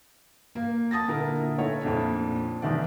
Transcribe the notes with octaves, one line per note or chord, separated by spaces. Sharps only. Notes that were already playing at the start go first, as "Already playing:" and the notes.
A#3
A5 D#6 A6 A#6
A#2 D3 E4 A#4
A3 D#4 E4 C#5
F2 A#2 D4
C2 D#3 E3 D5